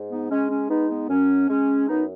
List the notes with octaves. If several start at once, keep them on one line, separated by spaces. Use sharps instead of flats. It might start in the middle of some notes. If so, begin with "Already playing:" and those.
Already playing: G#2
B3 D#4
G#3 C#4
C#4
G#3 B3 D#4
B3 D#4
F#2 C#4
G#3 C#4
F#2 B3 D#4